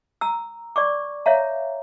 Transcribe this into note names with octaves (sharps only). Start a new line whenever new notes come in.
A#5 E6
D5 C#6 D6
C#5 E5 F5 A#5